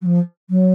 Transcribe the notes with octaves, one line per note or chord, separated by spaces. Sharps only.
F#3
F3
F#3